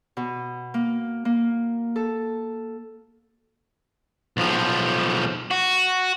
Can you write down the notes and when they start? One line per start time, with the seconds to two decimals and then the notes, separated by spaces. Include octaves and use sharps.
0.17 B2
0.74 A#3
1.25 A#3
1.96 A4
4.37 B1 F3
5.51 F#4